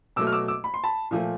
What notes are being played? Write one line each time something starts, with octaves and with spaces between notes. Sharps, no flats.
B2 F#3 A3 D6 E6
F6
D6 E6
D6 E6
B5
C6
A5 B5
A#2 F3 A3